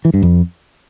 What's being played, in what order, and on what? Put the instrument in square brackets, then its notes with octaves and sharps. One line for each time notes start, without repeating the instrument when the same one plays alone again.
[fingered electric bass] E3
G2
F2